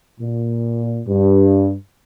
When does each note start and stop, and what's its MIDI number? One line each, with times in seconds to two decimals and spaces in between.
0.21 1.01 46
1.07 1.73 43